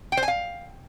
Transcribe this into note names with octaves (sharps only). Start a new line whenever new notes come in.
G5
C5
G#5
F5